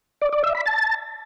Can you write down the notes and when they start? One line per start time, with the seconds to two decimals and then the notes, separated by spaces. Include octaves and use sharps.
0.22 D5
0.33 D5
0.44 E5
0.55 B5
0.66 A5